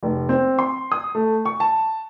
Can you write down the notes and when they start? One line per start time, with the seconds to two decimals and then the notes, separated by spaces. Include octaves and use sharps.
0.03 F1
0.29 C4
0.59 C6
0.92 D#6
1.15 A3
1.45 C#6
1.60 A5